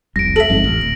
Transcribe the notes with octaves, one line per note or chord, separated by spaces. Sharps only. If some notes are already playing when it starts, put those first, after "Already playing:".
F1 C2 A#6 D7
A4 E5 F#7
G1 F2 G#2
A1
D1